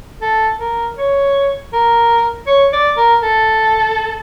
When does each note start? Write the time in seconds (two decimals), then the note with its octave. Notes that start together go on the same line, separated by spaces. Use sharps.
0.21 A4
0.60 A#4
0.98 C#5
1.73 A#4
2.47 C#5
2.73 D5
2.97 A#4
3.23 A4